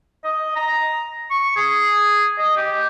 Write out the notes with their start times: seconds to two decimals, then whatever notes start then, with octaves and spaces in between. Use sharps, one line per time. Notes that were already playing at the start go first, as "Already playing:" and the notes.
0.24 D#5
0.56 A#5
1.30 C#6
1.56 G#4
2.38 D#5
2.57 G4